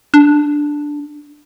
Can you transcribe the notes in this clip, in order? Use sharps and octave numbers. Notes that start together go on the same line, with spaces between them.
D4